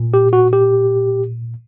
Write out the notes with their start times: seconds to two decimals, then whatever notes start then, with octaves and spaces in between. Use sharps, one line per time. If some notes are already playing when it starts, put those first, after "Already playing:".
Already playing: A#2
0.14 G4
0.33 F#4
0.53 G4